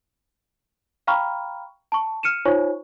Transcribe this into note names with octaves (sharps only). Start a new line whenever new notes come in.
F5 G5 A#5 B5 C#6 F6
A5 C#6
F6 C#7 D#7 E7
D#4 F4 C5 C#5 G#5 C#6